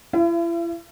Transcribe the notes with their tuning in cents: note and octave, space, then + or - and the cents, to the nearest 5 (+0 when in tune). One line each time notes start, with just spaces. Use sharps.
E4 +40 F5 -45